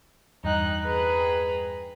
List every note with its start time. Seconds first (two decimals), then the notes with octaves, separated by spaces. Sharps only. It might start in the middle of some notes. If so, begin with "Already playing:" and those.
0.44 E2 G2 D#4 G5 F#6
0.82 G#4 B4 A#5